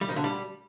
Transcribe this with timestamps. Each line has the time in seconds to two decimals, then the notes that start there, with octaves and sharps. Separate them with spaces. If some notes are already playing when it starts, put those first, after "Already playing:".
0.01 G3
0.09 D#3
0.16 D3
0.24 G3